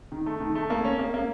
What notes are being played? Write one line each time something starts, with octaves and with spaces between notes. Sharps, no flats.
D#3
A3
D#3
A3
A#3
C#4
A#3
A#3